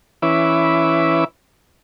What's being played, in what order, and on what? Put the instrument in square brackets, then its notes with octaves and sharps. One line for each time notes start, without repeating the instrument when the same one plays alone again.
[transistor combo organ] E3 C#4 E4 B4 E5 D6